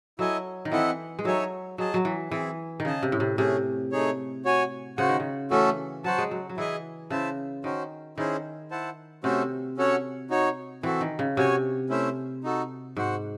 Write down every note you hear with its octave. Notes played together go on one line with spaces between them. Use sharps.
F#3 E4 A4 D#5 G#5
D#3
E3 C4 E4 A4 D#5 F#5
G#3
F#3 D#4 A4 C#5 E5 G#5
F#3 G#4 D#5 A5
F#3
E3
E3 C4 E4 G#4
D#3
C#3 G#4 D#5 A5
C3
A2
C3
C3 A3 C#4 G#4
A3 D#4 G#4 C#5
F#4 C#5 G#5
C#3 F#4 C5 F#5
D#3
C#3
E3 A3 C#4 F#4 A4
F#3 F#4 C5 F#5 A5
G#3
F#3
F#3
E3 E4 G#4 D#5 G#5
C#3 E4 C5 E5 A5
D#3 C#4 F#4 C5
D#3 C#4 E4 G#4 C5
E4 C5 F#5 A5
C3 A3 C#4 F#4 A4 C5
C#4 F#4 A4 C#5 F#5
D#4 F#4 C#5
E3 C4 F#4 A4
D#3
C#3
C3 F#4 C#5 G#5
A3 C#4 E4 C5 E5
D#4 F#4 A4
G#2 F#4 C5 F#5